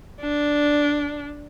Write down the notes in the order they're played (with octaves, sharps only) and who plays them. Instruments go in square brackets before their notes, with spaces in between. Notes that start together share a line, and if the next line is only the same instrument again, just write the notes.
[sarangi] D4